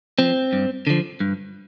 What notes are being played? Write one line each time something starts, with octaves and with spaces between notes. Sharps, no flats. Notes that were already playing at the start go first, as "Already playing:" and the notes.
F3 C4
G2
D3 F3
G2